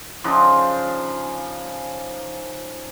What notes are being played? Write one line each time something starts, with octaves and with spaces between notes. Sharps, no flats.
C#3 F3 D4 D#4